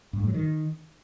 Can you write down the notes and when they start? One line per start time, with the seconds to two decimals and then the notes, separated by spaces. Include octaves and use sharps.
0.13 G2
0.20 A2
0.27 F#3
0.34 D#3